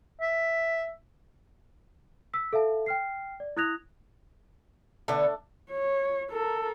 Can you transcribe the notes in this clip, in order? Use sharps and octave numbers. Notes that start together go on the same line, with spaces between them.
E5
E6 B6
A4 E5 F5 A5
G5 F6 C7
D5
E4 D#6 F#6 G#6 A#6 F7
D3 A3 B3 D4
C#5
A4 A#4